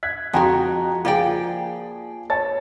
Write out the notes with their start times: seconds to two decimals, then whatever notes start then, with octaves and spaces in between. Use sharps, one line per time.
0.03 F#6 G#6 B6
0.33 F2 F3 G#3 F#4 G5 A#5
1.05 F3 A#3 G#4 D5 G5
2.30 C#5 A5 A6